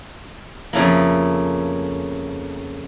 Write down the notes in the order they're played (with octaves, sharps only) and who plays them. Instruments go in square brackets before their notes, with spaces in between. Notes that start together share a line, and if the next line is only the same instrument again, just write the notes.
[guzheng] F2 C#3 A3 A#3